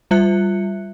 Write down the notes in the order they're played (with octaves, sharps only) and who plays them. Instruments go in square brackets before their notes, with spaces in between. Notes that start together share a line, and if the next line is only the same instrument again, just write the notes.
[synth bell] G3 F4 E5 F#6 C#7